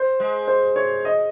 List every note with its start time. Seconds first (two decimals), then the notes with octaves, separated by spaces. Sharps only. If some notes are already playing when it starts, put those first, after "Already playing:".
Already playing: C5
0.20 G#3
0.47 C5
0.76 C#5
1.05 D#5